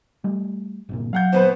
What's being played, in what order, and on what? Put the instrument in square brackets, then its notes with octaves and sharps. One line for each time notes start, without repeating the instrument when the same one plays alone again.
[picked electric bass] G3 A3
G1 C2 A#2
[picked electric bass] F#3 [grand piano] F5 F#5 G6
[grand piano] D#1 B3 B4 [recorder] C5